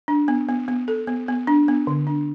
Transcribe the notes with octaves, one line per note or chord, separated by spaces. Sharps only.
D4
B3
B3
B3
A4
B3
B3
D4
B3
D3
D4